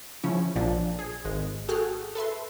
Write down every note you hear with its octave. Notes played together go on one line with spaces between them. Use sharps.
C#3 F3 C#4 E4 C#5
A#1 A#2 F3 D4
G#4
G#1 G#3
F#4 G#4 A4 G5 F6 F#6
A4 B4 E5 C6